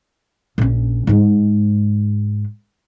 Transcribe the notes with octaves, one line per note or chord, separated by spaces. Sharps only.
A#1 C#4
G#2 G#3